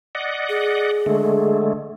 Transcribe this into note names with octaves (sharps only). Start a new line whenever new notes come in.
D5 D#5 F#5
G#4
D3 G#3 A3